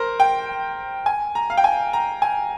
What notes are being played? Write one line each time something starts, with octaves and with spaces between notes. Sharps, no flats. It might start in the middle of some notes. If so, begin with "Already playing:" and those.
Already playing: A#4 C5
G5
G#5
A#5
F5
G5
G#5
A#5
G#5